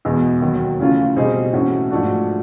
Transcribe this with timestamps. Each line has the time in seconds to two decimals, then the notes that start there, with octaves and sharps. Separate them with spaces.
0.05 E2 B2 G#3 B3
0.41 D#2 D#3 F#3
0.80 C#3 E3 A3 C#4 F4
1.16 B2 G3 C4 D#4 G#4
1.53 A2 E3 A3 C#4 F#4
1.91 G#2 F3 A3 D4 F#4